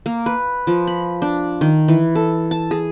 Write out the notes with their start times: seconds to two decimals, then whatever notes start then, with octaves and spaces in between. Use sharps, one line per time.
0.06 A#3
0.26 B4
0.67 F3
0.87 B5
1.22 D4
1.61 D#3
1.88 E3
2.15 A4
2.51 A5
2.71 G#4